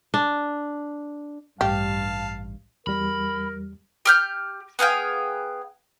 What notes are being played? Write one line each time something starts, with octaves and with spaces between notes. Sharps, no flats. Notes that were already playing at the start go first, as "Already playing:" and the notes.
D4
A1 G2 G4 F5 A5
E2 G3 A#4 B5
G4 F6 G6
B3 G#4 F5 G5